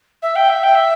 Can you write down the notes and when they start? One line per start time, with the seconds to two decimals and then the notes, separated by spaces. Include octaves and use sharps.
0.22 E5
0.35 G5
0.49 E5
0.63 G5
0.74 E5